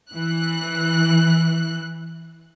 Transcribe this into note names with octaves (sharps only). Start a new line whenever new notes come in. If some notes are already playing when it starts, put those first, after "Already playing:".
E3 F#6